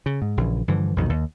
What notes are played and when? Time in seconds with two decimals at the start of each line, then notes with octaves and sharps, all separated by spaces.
0.06 C#3
0.22 G#2
0.37 A#1 C#3 E3
0.68 G2 D3 E3 F3
0.96 B1 F2 A#2 D#3
1.10 D#2